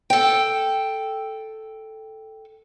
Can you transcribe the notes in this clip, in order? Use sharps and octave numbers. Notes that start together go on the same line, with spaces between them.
A4 G5